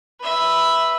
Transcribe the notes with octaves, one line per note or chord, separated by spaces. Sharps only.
B4 E5